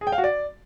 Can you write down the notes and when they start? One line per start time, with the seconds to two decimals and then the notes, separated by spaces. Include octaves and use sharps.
0.01 G#4
0.07 G5
0.12 F5
0.18 F#4
0.24 D5